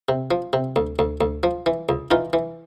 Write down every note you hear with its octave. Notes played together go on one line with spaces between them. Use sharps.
C3
F3
C3
D2
D2
D2
F3
E3
C#2
E3 D#4 F4
E3